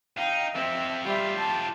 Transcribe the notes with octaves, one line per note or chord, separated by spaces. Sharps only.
D#4 F5 G5
F2 C4 E5
G3 F4 G4 E5
A5